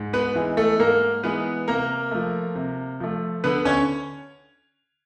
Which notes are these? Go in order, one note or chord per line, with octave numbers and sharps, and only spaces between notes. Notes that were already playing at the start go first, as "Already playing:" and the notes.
Already playing: G#2
B3 B4
E3 G#3 B3 D#4
A3 A4
G#2 A#3 A#4
E3 G#3 B3 D#4 B4
C3 A#3 A#4
F3 A3
C3
F3 A3
D3 B3 B4
C#4 C#5